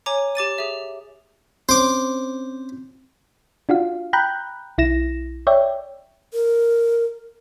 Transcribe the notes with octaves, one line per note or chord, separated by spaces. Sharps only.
C#5 G#5 A#5 D6
G4 D6 A6 D#7
G#4 E5
C4 C#4 C5 D6
D4 F4 F#4 F5
G5 A#5 B5 F#6 G6
B1 E4 A#6 E7
C#5 D5 E5 G5
A#4